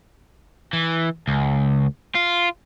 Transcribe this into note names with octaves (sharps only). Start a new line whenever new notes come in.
E3
C#2
F4